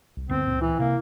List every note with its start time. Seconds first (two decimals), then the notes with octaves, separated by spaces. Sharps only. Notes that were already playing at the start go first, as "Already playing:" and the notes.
0.17 C2
0.29 D2 G2 B3 C4
0.47 C#2 A#2
0.61 E3 E4
0.80 C3 A#3